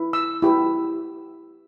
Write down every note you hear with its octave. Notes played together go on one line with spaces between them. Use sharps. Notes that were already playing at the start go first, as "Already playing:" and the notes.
Already playing: E4 B4
E6
E4 G4 B4